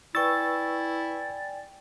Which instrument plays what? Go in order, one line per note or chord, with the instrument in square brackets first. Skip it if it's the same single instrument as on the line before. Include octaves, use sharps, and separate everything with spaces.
[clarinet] E4 [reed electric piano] B4 C#6 E6 [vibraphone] D5 G5 G#5 [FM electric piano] A6